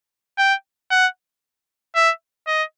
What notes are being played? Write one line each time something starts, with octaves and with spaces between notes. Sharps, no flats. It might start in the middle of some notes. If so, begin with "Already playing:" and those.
G5
F#5
E5
D#5